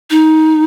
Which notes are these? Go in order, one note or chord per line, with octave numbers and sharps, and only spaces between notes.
D#4